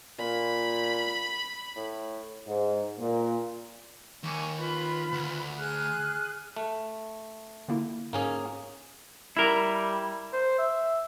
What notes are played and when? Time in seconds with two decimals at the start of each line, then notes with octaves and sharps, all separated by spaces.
0.19 A#2 B5
1.76 A2
2.47 G#2
2.99 A#2
4.24 D#2 G#5 C#6 D6
4.57 F4 B4 B5
5.13 D2
5.57 G#4 F6 F#6
6.56 A3
7.68 D3 A#3 E4
8.13 G#2 A#3 C#4 G#4
9.37 G3 E4 A#4
10.33 C5
10.58 E5